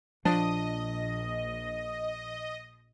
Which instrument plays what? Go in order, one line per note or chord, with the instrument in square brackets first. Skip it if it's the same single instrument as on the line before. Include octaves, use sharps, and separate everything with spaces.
[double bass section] A#1 [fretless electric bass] F3 [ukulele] D4 [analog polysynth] D#5